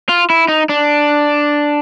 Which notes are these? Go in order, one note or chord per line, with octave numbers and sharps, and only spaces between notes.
F4
E4
D#4
D4